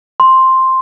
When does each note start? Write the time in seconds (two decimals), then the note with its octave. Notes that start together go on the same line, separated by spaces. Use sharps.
0.20 C6